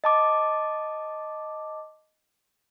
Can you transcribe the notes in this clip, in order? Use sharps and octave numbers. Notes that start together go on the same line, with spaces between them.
D#5 A5 D6